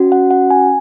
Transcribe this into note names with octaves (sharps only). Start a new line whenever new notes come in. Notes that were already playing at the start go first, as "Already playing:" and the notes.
Already playing: C#4 F#4
F#5
F#5
G#5